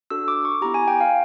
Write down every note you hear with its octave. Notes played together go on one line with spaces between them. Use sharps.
D4 F#4 A4 E6
D6
C#6
B3 E4 G4 A#5
G#5
G5
F5